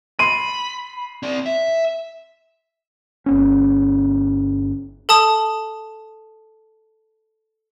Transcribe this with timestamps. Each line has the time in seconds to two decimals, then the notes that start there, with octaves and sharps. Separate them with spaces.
0.19 B5 C6 D#7
1.23 C4 D5
1.46 E5
3.26 G1 B3 C#4
5.09 A4 A5 D#6